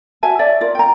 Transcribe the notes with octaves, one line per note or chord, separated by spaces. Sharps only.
F#4 E5 G#5 A5
C#5 D5 E5
F4 A#4 D5
G5 A#5